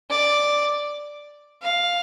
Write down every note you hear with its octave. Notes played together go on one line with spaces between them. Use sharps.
D5
F5